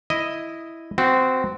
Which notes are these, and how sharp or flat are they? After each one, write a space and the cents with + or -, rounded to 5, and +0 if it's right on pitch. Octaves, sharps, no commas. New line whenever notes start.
E4 +0 D#5 +0
C4 -15 F#4 +0